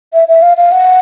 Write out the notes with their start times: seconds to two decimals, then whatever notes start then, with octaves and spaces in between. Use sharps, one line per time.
0.14 E5
0.28 E5
0.42 F5
0.57 F5
0.72 F#5